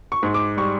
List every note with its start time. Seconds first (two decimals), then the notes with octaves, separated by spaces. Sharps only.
0.12 C#6
0.23 G#2
0.34 D6
0.57 G3 C#6